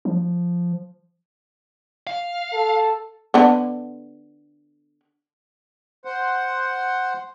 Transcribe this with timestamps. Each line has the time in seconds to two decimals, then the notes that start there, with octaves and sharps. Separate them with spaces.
0.05 F3
2.07 F5
2.53 A4
3.34 D3 B3
6.05 C5 F#5